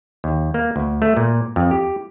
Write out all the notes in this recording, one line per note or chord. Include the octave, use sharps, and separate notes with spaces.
D#2
A#3
D2
A3
A#2
F2
G4